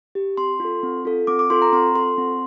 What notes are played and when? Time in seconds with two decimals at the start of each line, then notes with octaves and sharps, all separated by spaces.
0.15 G4
0.37 C4 C6
0.60 F4 A4
0.83 C4
1.05 F4 A4
1.27 C4 D6
1.39 D6
1.50 F4 A4 C6
1.62 A#5
1.73 C4 C6
1.95 F4 A4 C6
2.18 C4